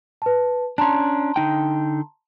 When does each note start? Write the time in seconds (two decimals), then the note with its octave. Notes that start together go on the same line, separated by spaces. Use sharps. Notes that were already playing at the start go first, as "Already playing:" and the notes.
0.22 B4 A5
0.78 C#4 D4 A5 A#5 C6
1.36 D3 D#4 G5